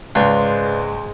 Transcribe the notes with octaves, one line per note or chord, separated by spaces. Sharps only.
C#2 G#2 G#3 B4 D5 F5